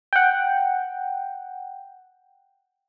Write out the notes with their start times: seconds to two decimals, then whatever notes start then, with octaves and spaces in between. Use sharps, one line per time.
0.13 F#5 G5